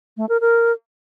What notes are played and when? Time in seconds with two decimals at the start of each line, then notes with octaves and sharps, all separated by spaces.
0.17 A3
0.29 A#4
0.41 A#4